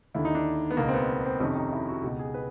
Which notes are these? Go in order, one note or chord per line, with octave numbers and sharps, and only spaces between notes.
D#2 D3 E4
D#4
D4
B3
C#2 B2 A#3
C4
B3
C4
F2 C3 D#3 C#4
D#4
E4
F#4
C#2 B2 G4
G#4
B4